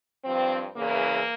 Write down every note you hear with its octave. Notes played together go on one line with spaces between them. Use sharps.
G2 F3 C4
E2 C#3 E3 A#3